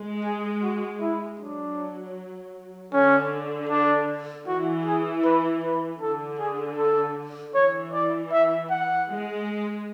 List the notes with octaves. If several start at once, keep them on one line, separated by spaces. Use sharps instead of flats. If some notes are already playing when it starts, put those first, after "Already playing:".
Already playing: G#3
G#4
F#4
E4
F#3 D4
D3 C#4
D4
E3 F#4
G#4
B4
B4
D3 A4
G#4
A4
E3 C#5
D5
E5
F#5
G#3